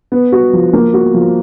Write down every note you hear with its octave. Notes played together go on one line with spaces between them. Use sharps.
B3
F#4
F3
A#3
F#4
F3